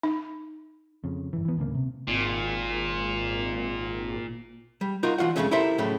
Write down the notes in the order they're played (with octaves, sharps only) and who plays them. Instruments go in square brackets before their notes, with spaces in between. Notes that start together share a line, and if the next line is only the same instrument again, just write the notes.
[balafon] D#4
[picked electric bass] F2 C#3
G1 E3
E3 B3
D1 D2 C#3 A#3
C3
[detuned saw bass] G#1 [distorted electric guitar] A#2
[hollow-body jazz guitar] G3
D#4 F4 F#4 A#4
E3 F4 F#4 F#5
F2 A#2 C#3 G#3 A3 C#4
E4 G4 A4 A#4 C5 E5
A2 C#3 F#3 A3